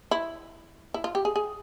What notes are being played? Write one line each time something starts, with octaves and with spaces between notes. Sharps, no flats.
E4
E4
F4
G4
G#4
G#4